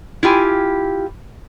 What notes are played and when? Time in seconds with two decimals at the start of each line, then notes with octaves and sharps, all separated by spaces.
0.23 E4 F4 G4 G#5